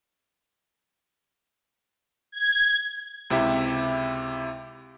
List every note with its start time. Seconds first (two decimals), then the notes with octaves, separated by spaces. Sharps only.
2.32 G#6
3.30 C#2 C3 E4 G4 E5